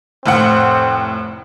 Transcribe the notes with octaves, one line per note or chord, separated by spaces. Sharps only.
F1 A2 C4 F#5